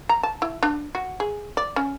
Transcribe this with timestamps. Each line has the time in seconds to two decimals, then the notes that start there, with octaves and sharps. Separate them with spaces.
0.09 A#5
0.23 A5
0.42 E4
0.63 D4
0.95 F#4
1.20 G#4
1.57 D5
1.76 C#4